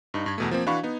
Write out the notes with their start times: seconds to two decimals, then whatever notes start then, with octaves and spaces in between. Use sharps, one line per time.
0.14 G2 D#4
0.26 G2 G#6
0.38 E2 B2 A3
0.51 F3 A#3 C4
0.66 E3 D4 F#4 F5 B5 C#6
0.83 B3 D#4